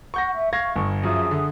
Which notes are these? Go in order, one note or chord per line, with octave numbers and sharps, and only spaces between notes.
F#5 C#6 G6 A#6
E5
F5 C#6 G#6 A#6
G1
F#2 F3 G#4 E5 D#6
D3